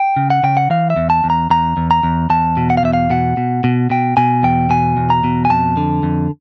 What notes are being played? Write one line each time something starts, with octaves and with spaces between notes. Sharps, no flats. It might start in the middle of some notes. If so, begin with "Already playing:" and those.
Already playing: G5
C#3
F#5
C#3 G5
F#5
E3 F5
E5
E2
A5
E2
A#5
E2 A#5
E2
A#5
E2
E2 A5
B2
F#5
F5
E2 E5
F5
B2 F#5
B2
B2
B2 G5
B2 G#5
E2 G5
B2 G#5
E2
A#5
B2
G#5
F2 A5
D3
F2